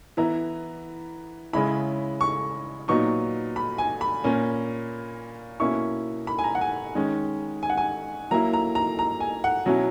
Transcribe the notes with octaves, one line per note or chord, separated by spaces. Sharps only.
E3 B3 E4 A#5
C#3 G#3 C#4 E4 B5
C#6
A#2 F#3 B3 D#4 C#6
B5
G#5
B5
A#2 A#3 C#4
B2 A#3 C#4 E4 C#6
B5
G#5
A#5
F#5
G#5
D#3 G#3 C#4
G#5
F#5
G#5
F#3 A#3 E4 A#5
A#5
A#5
A#5
G#5
F#5
B2 F#3 C#4 E4